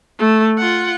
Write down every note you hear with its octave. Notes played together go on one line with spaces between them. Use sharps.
A3
F4 F#5